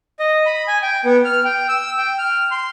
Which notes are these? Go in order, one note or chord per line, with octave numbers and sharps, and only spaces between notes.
D#5
B5
G#5
G5
B3
F6
G5
E6
G5
F6
C6